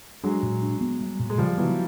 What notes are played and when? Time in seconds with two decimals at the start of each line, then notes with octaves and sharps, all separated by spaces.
0.24 F#3 G#3 D4
0.43 A#2
0.62 D4
0.81 B3
1.01 G3
1.20 A#2
1.30 G#3
1.38 C#3 F3 G3
1.58 E3 F#3 B3